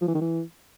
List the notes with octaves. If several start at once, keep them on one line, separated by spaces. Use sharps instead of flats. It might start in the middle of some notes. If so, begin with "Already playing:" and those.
F3
E3
D#3
E3